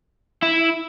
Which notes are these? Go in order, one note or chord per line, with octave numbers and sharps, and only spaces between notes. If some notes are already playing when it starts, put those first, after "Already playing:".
E4